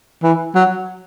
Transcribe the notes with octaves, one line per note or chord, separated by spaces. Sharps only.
E3
F#3